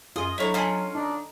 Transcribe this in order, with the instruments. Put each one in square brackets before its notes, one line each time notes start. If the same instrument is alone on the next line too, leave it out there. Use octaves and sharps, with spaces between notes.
[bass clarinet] F#2 [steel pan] F4 G#4 D#6 [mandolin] D#5
[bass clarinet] F#3 [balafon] D4 A4 D#5 [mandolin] E4 C#5
[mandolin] C#4 F4 [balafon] D#5 A5 [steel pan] F5 G#5
[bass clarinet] D4 [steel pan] D#4